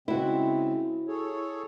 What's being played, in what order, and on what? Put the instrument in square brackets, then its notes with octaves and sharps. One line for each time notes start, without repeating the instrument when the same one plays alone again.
[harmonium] C#3 G#3 C4 [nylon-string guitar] E4 F#4
[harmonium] G#4 A4 C#5